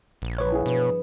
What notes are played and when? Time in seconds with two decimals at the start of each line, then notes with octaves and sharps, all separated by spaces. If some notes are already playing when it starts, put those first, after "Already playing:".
0.22 A#1
0.38 G1 F3 B4 C#5
0.52 E4 G#4
0.66 B2 B3